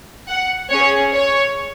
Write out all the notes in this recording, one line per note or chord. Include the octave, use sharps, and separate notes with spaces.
F#5
C#4 G#4 C#5
C#5